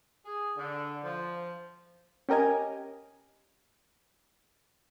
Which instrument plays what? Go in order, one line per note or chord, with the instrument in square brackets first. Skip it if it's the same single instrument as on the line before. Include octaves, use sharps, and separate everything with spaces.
[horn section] G#4
D3
F3
[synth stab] C#4 G4 A#4 D#5 G#5